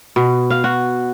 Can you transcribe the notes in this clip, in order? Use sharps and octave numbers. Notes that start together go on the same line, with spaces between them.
B2
F5
F#4